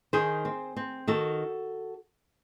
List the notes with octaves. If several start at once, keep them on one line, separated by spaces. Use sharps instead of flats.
D#3 G#4 C5
C4
C4
D#3 F#4 A4